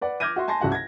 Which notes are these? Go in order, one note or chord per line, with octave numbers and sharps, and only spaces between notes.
B4 D5 F#5
D6 F6 G6 G#6 A#6 D#7
F#4 E5 C6
G#5 A5 C6 A#6
C2 C#3 F#4 F#5 A5
G#6 A#6